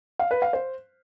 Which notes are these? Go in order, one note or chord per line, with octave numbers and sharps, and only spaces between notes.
F5
B4
F5
C5